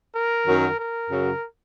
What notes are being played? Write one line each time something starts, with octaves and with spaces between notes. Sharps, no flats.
A#4
F#2 D#3 F#3
A#4
F#2 C#3 F#3